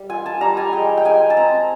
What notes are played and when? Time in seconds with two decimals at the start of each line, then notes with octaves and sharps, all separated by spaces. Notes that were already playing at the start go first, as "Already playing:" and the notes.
Already playing: G3
0.10 F4 G#5
0.26 A5
0.41 G3 A#5
0.57 G#5
0.73 G#3 G5
0.97 G5
1.05 G#3 G#5
1.30 A5
1.37 C4 A#5